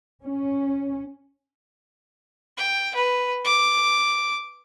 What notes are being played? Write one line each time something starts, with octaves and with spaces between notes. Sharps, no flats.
C#4
G5
B4
D6